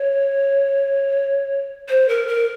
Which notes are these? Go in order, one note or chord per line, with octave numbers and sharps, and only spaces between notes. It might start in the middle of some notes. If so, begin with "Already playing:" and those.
Already playing: C#5
C5
A#4
A#4